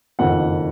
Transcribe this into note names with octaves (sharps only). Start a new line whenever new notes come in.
F#1 F2 D#3 F#5